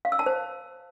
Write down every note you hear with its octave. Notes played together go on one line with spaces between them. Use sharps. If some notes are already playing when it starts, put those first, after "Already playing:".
F5
E6
A5
C5